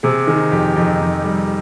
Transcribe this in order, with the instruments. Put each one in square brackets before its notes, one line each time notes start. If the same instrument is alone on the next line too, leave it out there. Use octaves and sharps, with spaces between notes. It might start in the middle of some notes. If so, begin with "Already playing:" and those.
[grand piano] C3 G#4
D#3 G#4
F2 G4
F2 D#4
F2
G3